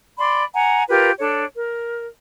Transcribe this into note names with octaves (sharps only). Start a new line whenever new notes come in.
D5 B5 C6
F#5 G#5 A#5
F4 G4 A#4 B4
D4 A4 C#5
A#4